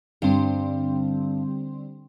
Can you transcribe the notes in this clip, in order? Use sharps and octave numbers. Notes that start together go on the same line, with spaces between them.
G2 D3 G3 C4